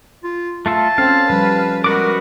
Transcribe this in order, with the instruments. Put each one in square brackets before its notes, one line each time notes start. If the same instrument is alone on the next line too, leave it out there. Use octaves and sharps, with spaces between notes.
[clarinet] F4
[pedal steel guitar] A3 F4 A4 [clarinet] A5
[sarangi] C4 [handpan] C#4 A4 [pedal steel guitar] F5
[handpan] F3 G3 [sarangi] B4
[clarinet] G#3 [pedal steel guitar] B3 F#4 D6 [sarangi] A#4